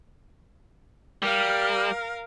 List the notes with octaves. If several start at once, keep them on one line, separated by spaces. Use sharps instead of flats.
G3 A#4 F5